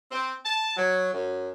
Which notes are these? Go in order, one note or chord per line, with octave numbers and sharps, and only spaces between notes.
C4
A5
F#3
F#2